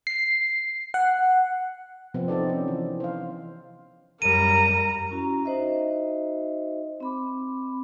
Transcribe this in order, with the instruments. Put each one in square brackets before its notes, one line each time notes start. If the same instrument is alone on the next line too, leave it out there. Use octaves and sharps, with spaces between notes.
[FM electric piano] C7
F#5
[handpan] C3 F3 B3 C4
C4 D#4 A4 D5
C#4
E3
C5 F5
[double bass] F#2 G3 [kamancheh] A#4 A#5 [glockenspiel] D#7
[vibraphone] C#4 E4 F#4 A#5
D#4 F#4 C5 D#5 E5
C4 B5 D6